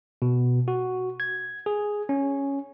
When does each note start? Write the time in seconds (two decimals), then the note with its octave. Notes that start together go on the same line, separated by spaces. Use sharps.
0.22 B2
0.68 F#4
1.20 G#6
1.66 G#4
2.09 C#4